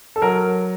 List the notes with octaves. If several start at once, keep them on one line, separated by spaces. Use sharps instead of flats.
A4
F#3 A#4